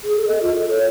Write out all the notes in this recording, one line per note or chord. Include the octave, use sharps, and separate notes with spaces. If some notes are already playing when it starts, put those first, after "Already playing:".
G#4
A4
D#5
F4
A4
C#5